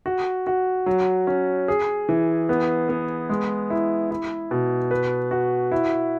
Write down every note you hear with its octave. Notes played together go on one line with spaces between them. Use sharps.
F#4
F#4
F#3
C#4
G#4
E3
B3
B3
G#3
E4
E4
B2
B4
F#4
E4